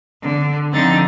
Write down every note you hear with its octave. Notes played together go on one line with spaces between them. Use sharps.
D3
D3 F3 C4 D#4 A6